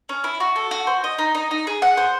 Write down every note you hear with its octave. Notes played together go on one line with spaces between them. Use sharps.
C#4
E4
F#4
A4
F#4
C5
D#5
D#4
D#4
D#4
G#4
F#5
C5